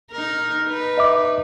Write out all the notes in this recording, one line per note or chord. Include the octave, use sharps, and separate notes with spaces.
D#4 A#4
D#4 B4
D#5 E5 D6